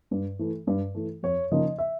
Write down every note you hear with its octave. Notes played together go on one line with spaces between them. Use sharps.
G2
E3 A3
G2
E3 A3
F2 C#5
C#3 F3 A#3 D#4 D#5
E5